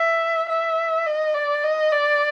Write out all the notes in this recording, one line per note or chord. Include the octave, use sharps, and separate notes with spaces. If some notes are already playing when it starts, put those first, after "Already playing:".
Already playing: E5
E5
D#5
D5
D#5
D5